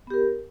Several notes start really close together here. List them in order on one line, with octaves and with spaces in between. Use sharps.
B3 G4 A#4